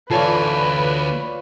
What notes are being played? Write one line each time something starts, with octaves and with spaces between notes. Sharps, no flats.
D2 E3 F4 A4 B4 C#5 D5 G#5